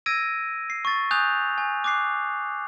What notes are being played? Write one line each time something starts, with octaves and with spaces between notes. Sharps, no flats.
E6 G#6 A#6 D7 D#7
C7
C#6 A6
G#5 D#6 F#6 G6 F7
G#5
D6 F#6 C7